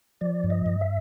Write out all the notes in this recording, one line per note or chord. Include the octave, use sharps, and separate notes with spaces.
F3 D5
G2
D#5
G2
E5